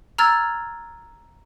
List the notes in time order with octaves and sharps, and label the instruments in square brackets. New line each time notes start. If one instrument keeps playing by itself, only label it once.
[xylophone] A#5 E6 F6 G#6 A6